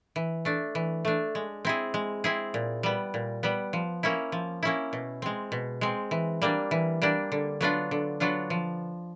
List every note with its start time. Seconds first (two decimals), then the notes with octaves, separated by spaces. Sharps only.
0.16 E3
0.45 A3 D4
0.75 E3
1.05 A3 D4
1.35 G#3
1.65 C4 E4 G#4
1.94 G#3
2.24 C4 E4 G#4
2.54 A#2
2.83 G3 B3
3.14 A#2
3.43 G3 B3
3.73 F3
4.03 A#3 C#4 E4
4.32 F3
4.63 A#3 C#4 E4
4.93 B2
5.22 G#3 C4
5.52 B2
5.81 G#3 C4
6.11 E3
6.42 G3 A#3 D4
6.71 E3
7.02 G3 A#3 D4
7.32 D3
7.61 F#3 B3 D4 F4
7.91 D3
8.20 F#3 B3 D4 F4
8.50 F3